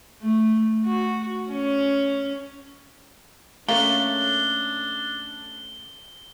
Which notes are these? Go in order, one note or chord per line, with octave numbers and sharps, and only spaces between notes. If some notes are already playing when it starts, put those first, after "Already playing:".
A3
F#4
C#4
A3 A#3 C#4 D4 G7